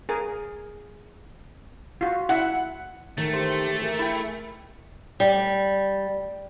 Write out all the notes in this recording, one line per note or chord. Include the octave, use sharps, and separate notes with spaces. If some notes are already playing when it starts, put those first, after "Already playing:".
G#4 A#4 G#5
F4 F#4
E4 E5 F#5
D#3 A3 A#4
G4 C5
G#4 A#4
E4 G5
G3